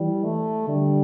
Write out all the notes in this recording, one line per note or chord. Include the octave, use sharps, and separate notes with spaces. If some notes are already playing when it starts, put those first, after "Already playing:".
Already playing: E3 G3
A3
D3 G3